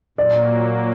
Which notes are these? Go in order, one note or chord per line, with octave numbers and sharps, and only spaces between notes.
A#2 F#3 A#3 D5